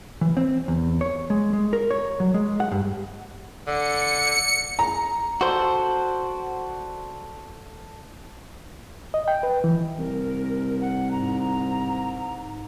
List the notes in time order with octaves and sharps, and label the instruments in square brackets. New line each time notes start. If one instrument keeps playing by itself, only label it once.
[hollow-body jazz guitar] E3
C4
E2
C#5
G#3
G#3
A#4
C#5
F#3
G#3
F#5
G2
[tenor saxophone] D3 [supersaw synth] C#7
[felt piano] A#5
[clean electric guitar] F#4 C5 [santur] A4 D5 A5
[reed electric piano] D#5
G5
B4
E3
[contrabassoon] C2 [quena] A#4
[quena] F#5
[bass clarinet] G#2 [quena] A#5